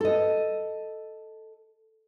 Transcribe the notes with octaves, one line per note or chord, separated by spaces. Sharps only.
A4 D#5